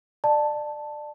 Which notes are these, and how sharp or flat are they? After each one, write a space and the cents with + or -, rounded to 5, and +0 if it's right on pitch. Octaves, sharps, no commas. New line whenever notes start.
D5 +25 A5 +0